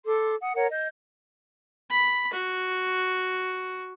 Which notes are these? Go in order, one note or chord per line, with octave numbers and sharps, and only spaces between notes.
A4 C6 D6
F#5 D#6
A#4 C#5 F#5
D#5 G6
B5
F#4